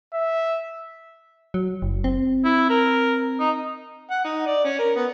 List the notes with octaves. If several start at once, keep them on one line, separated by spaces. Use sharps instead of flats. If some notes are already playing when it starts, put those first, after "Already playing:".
E5
F#3
F#1
C4
E4
A#4
D#4
F#5
D#4
D5
C#4
A#4
B3